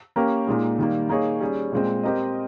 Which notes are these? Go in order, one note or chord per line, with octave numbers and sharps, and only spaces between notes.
A#3 C#4 G4 A#4
A#2 G#3 D#4
D#3 G3 A#3
A#3 D#4 G#4 C#5
G3 C#4 G#4
A#2 G#3 C4
C4 G4 A#4 D#5